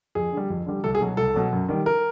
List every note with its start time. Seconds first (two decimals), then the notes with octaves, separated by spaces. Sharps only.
0.15 F2 G#4
0.32 D3 G3
0.50 F2
0.66 D3 G3
0.84 C2 A4
0.95 G#4
1.01 B2 F#3
1.17 C2 A4
1.34 B2 F#3
1.53 F#2
1.69 D#3 G3
1.86 A#4